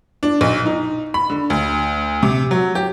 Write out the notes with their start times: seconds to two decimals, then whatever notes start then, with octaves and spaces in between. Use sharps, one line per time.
0.23 D4
0.41 B1
0.66 D#4
1.14 B5
1.30 D3
1.50 D2
2.23 C3
2.51 F#3
2.75 G4